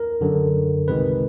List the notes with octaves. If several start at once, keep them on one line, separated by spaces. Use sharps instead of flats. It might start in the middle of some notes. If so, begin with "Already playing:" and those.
Already playing: A#4
F#2 D3 F#3
C2 C3 D#3 G#3 B4